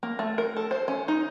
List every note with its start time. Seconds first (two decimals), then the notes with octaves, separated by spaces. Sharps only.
0.03 A#3
0.19 A3
0.38 A#4
0.57 A4
0.71 C5
0.88 C#4
1.08 D#4